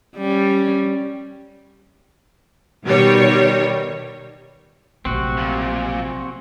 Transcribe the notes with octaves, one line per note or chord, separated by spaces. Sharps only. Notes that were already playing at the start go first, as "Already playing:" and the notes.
G3 C#4
B2 D#3 G3 C#5
A#1 C3 F#3 A3 C4 F#4
A#2